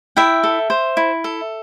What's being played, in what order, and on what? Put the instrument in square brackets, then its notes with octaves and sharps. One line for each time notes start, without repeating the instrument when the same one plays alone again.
[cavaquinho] E4 E5 G5
A4
C5
E4
A4